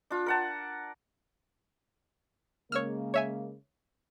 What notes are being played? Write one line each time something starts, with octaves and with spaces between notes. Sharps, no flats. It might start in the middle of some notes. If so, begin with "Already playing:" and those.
D4 F4
A#4 F#5 A5
C#3 G#3 A#3 C#5 E6 F6
C#5 E5 G#5